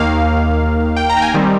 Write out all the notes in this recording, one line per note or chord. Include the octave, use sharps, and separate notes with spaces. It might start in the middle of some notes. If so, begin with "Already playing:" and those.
Already playing: D#2 D#3 A#3 F5
G5
A#5
G5
G#5
D#3 G3 C4